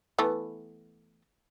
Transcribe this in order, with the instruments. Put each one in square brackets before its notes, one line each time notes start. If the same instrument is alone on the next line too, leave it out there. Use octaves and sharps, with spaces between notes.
[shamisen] E3 A3 B3